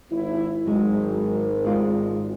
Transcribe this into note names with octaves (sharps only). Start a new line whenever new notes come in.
G#1 E4
G#1 F#3 G#3 D#4
G#3 F4 D5